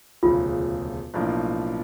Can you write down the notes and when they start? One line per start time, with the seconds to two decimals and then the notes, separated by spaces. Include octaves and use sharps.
0.23 E1 D2 C#3 F3 F4
1.14 B1 A2 F3 A#3 D4